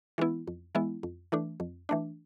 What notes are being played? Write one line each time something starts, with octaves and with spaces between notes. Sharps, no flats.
E3 G#3 B3 E4
F2
E3 G#3 B3 E4
F2
E3 A3 D4
F2
E3 A3 D4